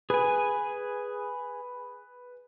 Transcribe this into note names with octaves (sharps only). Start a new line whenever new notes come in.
G#4 B4 G#5